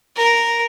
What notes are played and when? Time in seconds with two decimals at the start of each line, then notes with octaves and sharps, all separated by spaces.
0.16 A#4